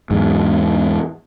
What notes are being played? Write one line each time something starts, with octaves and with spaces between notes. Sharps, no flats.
E2 G#2